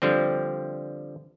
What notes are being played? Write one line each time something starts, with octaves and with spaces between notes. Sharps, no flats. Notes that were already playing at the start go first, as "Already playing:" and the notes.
D3 F3 G3 C4